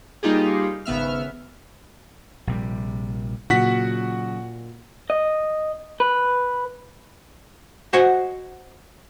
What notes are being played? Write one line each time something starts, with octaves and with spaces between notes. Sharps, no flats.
G3 A#3 D#4 F4 G4 G#4
G#1 C#3 B3 E5 F6
A#1 C3 G3
A#2 C#3 F#3 F#4 F#5 B6
D#5
B4
F#4 C5 D#5 F#5 G#5